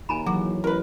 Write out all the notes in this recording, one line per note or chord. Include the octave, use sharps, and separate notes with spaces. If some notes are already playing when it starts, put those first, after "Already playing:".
D#2 G#5 A#5 B5
E3 F#3 F#4 G#4
A1 A#4 B4